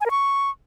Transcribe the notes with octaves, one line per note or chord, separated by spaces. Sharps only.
G#5
A#4
C#6